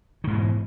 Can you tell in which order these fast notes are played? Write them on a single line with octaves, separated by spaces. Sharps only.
D#3 G#2 E3 B2